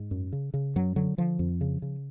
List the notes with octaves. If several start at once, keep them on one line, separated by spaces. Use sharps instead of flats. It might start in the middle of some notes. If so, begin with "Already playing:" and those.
Already playing: G#2
F#2
C#3
C#3
F#2 F#3
D3 F#3
D3 F3
F2
C#3
C#3